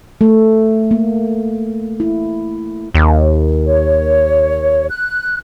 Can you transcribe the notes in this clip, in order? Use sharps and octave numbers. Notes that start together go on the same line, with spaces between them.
A3
A#3
E4
D#2
C#5
F#6